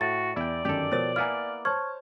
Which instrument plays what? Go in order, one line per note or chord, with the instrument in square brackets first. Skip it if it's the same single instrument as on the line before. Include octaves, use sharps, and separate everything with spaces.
[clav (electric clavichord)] A2 [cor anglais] F#4 [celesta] A6
[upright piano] E2 [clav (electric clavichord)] E4 G5 [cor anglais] D5
[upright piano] G1 F#2 D#3 [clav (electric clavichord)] G4 A4 [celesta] G6
[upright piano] B2 F3 A6 [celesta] A#4 C5 C#5
[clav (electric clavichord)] A#3 B3 E4 [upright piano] F5 G#5 [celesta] F6
[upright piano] C5 C#5 A5 [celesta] C#6 F6 G#6